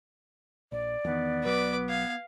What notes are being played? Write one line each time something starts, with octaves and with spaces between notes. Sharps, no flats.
A#1 D5
E2 D#3 B3
B1 F#3 B4 D6
F5 G#6